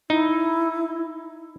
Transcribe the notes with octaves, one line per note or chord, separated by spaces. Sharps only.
D#4 E4